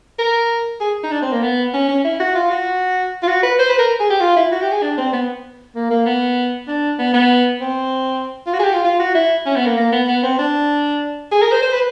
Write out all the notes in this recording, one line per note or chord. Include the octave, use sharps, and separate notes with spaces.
A#4
G#4
D#4
D4
C4
A#3
B3
C#4
C#4
E4
F#4
F4
F#4
F4
F#4
B4
C5
B4
A#4
G#4
G4
F4
E4
F#4
G4
G#4
D4
C4
B3
A#3
A#3
B3
D4
B3
B3
C4
F4
F#4
G#4
G4
F4
F4
F#4
E4
C#4
B3
A#3
A#3
B3
B3
C4
D4
G#4
A#4
C5
C5
B4